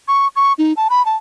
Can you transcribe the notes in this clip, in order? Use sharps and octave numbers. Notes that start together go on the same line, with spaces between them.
C#6
C#6
D#4
A5
B5
A5